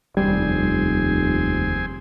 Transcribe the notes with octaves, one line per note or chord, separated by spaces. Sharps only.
F1 D#2 G3 C4 D4 G#4 G#5